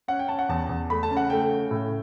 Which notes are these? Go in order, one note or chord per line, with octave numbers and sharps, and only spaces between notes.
C#4 F#5
G5
C#4 A5
F#5
E2 A5
E2
A3 B5
A5
C#3
F#5
A3 G5
C#3
A2